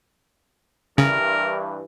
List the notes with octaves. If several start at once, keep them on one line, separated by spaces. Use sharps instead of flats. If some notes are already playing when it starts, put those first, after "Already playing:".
G2 C#3 E3 A#4